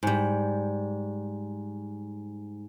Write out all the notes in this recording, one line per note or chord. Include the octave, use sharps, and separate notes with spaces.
G#2 G3